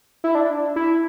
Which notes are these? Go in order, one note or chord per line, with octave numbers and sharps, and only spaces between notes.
E4
D4
E4